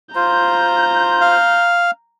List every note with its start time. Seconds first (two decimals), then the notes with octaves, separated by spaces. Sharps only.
0.15 F4 C5 A#5 G6
1.21 F5